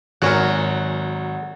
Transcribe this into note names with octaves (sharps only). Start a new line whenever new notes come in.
G#1 F#3 F#4 A#4 C#5 F#5 G#5